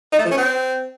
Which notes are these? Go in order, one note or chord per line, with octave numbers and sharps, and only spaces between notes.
D#4
A3
F3
C#4
C4